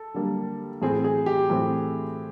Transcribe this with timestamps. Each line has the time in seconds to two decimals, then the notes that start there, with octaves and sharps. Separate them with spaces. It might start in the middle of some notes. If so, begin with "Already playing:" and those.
Already playing: A4
0.14 D3 G3 A#3
0.82 A2 E3 A3 C4 G#4
1.04 G#4
1.26 G4
1.50 A2 E3 A3 C4